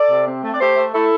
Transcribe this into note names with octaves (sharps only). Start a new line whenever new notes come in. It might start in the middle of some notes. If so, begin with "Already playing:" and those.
Already playing: A4 D5
C3
C4
A3
D5
A3 G4 C5
A3
A3 E4 A4